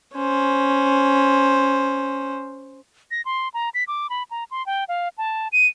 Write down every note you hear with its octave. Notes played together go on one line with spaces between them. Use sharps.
C#4 C5
A#6
C6
A#5
B6
D6
B5
A#5
C6
G5
F5
A5
D#7